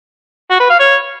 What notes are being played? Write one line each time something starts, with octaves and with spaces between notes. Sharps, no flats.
F#4
B4
F5
C#5